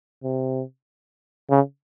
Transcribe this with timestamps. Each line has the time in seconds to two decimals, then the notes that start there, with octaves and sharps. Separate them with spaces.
0.23 C3
1.50 C#3